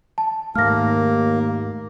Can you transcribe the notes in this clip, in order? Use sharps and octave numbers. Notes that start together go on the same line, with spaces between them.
A5
D#2 G#2 A3 A#3 F6 A#6